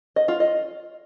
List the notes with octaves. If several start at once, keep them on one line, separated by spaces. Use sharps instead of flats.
D#5
F4
D#5